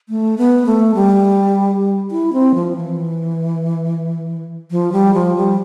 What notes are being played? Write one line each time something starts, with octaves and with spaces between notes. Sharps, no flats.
A3
B3
A3
G3
E4
C4
F3
E3
F3
G3
F3
G3